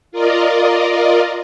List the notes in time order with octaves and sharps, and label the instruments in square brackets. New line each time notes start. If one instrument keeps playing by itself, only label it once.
[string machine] F4 A#4 D5 D#5